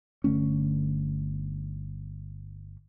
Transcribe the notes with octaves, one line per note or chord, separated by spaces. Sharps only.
G1 D3 A3 C#4